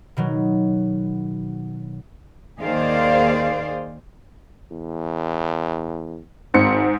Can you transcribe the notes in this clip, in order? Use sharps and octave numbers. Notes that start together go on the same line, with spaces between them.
B2 D#3 F#3
D#2 D#3 G#4 C5 D5 F5
E2
G#1 G#2 C4 C#7